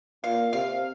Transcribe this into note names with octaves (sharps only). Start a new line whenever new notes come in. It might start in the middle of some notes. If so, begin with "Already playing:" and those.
A#2 F5
C3 F5